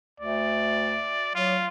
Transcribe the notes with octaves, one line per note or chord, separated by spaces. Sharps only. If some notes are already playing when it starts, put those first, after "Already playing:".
D2 D5
F#3 F4